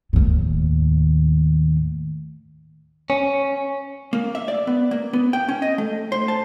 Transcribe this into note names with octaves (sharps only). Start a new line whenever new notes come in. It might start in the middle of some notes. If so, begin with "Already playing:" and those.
D#2 A2
C#4
A#3
E5
D5
B3
A#3
B3
G5
C#4
D#5
A3
C5
A5